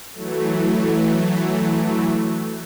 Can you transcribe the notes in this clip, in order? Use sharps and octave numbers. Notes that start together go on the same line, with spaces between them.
E3 F#3 A3